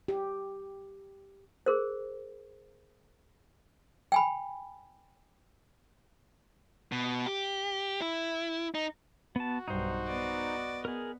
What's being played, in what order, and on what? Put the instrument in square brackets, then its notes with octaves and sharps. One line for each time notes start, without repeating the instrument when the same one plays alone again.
[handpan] G4
[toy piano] G#4 A#4 C5
G5 G#5 B5
[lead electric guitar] B2
G4
E4
D#4
[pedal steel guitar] B3 A5 [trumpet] F#4
[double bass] B1 G2 [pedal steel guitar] D#4 C5
[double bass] B3 [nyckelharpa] D5 D#5
[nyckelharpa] B3 [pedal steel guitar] G#4 A#4